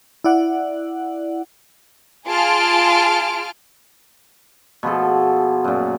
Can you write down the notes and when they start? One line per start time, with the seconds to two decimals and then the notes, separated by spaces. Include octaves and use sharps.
0.24 E4 D5 F#5
2.28 F4 G#4 A5 C6 F6 D7
4.83 B2 F3 G#4 A4
5.64 F#2 A#2